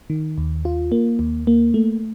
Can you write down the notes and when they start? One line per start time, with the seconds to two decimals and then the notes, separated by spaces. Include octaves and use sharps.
0.10 D#3
0.38 D#2
0.65 F4
0.92 A#3
1.19 D#2
1.47 A#3
1.74 A3